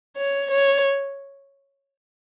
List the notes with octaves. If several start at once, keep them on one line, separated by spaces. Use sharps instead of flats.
C#5
C#5